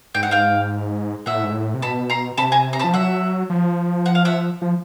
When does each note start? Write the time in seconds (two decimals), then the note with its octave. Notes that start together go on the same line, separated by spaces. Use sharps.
0.15 G#2 G5
0.23 F#5
0.31 F5 G5
1.26 A#2 E5 F#5
1.35 A2
1.43 G#2
1.52 A2
1.74 C3
1.82 B2 A5 B5
2.10 A#5 C6
2.38 C3 A5 B5
2.52 G#5 A#5
2.73 A#5
2.79 A5 B5
2.84 F3
2.93 F#3 E5 F#5
3.50 F3
4.06 F#5
4.15 F5
4.25 E5 F#5
4.62 F3